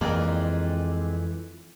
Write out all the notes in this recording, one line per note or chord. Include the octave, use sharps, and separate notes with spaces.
F2 E3 G#3 A#3 C4 A#4 D5